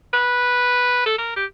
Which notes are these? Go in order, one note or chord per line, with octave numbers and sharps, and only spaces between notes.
B4
A4
A#4
G4